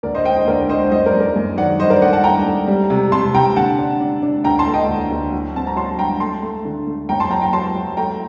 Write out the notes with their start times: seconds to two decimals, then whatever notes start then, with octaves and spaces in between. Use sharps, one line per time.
0.03 D2 A#4 D5
0.15 C5 D#5
0.25 D4 D#5 G5
0.36 C5 D#5
0.47 D2 A#4 D5
0.70 D4 C5 D#5
0.92 F#2 C5 D#5
1.06 A#4 D5
1.14 F#2
1.20 A#4 D5
1.36 F#2
1.57 D#3 D5 F#5
1.80 G2 C5 D#5
1.90 A#4 D5
2.02 A3 D5 F#5
2.13 F#5 A5
2.24 G2 G5 A#5
2.46 A3
2.68 G3
2.90 C3
3.12 C3 A5 C6
3.34 C3 G5 A#5
3.56 D3 F#5 A5
3.78 D4
4.00 D4
4.23 D4
4.44 D2 G5 A#5
4.59 A5 C6
4.66 A3
4.74 D#5 G5
4.89 D2
5.11 D2
5.32 F#3
5.54 C4 A5
5.67 A#5
5.76 F#3 A5 C6
5.99 G2 G5 A#5
6.20 A3 A5 C6
6.43 A3
6.65 D3
6.87 A3
7.09 F#2 G5 A#5
7.20 A5 C6
7.31 F#3 G5 A#5
7.42 G5 A#5
7.53 F#3 A5 C6
7.75 F#3
7.97 A3 G5 A#5